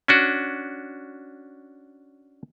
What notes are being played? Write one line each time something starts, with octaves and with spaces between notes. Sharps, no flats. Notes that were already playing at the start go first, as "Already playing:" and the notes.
C#4 D4 F#4